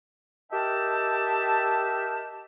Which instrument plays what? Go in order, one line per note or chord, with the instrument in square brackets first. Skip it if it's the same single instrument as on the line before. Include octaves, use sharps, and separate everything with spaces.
[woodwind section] G4 A#4 D#5 E5 G5 A5